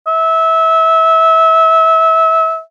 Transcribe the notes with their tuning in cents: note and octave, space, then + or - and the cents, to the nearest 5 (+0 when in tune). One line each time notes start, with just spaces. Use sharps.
E5 -25